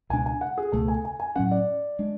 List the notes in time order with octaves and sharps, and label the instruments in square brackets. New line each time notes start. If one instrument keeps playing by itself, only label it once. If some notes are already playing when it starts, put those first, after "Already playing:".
[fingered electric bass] C#2 B2 G#3 D4 [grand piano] G#5
[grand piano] G#5
F#5
G#4
[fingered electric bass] C#2 B2 A3 [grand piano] A4
[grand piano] G#5
G#5
G#5
[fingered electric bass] A2 F#3 C#4 [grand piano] F#5
[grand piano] D5
[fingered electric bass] G#3 D4